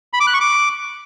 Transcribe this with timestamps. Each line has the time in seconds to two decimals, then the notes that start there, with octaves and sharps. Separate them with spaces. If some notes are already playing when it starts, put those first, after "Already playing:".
0.13 B5
0.20 D6
0.27 F#6
0.34 C#6
0.40 D6